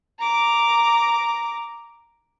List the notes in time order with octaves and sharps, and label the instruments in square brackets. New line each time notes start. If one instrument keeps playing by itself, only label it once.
[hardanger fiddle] A#5 D6